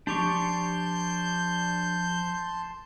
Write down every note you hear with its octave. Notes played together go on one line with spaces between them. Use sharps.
F3 D4 G4 A5 C6 C#6 G6